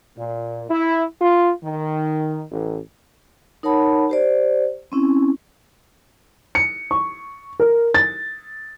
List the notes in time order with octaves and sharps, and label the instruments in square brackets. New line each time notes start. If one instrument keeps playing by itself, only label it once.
[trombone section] A#2
E4
F4
D#3
A1
[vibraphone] D#4 A#4 C#5 F#5 A5 B5
G4 C5 D5
C4 C#4 E4
[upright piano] C#7
C#6
A#4
A6